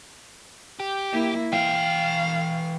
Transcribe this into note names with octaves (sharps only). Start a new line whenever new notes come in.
G4
A#3 E4
E3 F5 G5